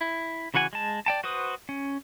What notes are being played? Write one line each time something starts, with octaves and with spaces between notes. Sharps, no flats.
E4
C#3 E3 F#4 F#5 G#5
G#3 A5
D5 G5 A5
F#4 B4 C5 D#6
C#4